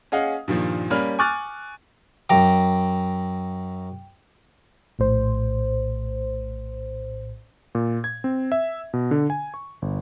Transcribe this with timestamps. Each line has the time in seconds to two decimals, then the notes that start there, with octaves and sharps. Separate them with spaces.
0.12 C#4 G#4 D#5 F5 F#5
0.48 G2 A#2 D#3 F3
0.90 G3 A#3 C#4 B5 F6
1.19 G#5 C#6 D6 F6 F#6 A6
2.29 F#2 G5 A#5 D6
4.99 A#1 A2 C5
7.75 A#2
8.04 G#6
8.24 C4
8.52 E5
8.94 B2
9.11 D3
9.30 G#5
9.54 C#6
9.82 G1